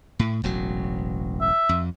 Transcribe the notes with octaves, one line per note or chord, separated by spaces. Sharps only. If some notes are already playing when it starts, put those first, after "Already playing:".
A2
E1 A1 F#3
E5
F2